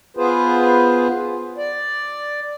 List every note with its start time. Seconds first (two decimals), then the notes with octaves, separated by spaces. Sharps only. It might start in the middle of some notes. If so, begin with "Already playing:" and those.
0.17 B3 F4 G#4 B4 C5
1.58 D5